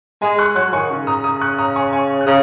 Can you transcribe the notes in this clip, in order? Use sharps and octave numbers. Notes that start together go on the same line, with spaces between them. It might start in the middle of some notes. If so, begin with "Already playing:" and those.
G#3 D#5 G#5
C#6 F#6
F#3 C#6 F#6
D#3 G#5 C#6
C#3
A#5 D#6
A#5 D#6
C#6 F#6
A#5 D#6
G#5 C#6
G#5 C#6
F#6
C#3 A#5 D#6